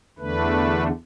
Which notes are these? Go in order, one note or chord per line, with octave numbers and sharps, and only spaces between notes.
E2 D3 A3 D4 B4